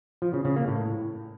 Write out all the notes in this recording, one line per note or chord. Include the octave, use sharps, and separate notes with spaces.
F3
C#3
C#3
A#3
A2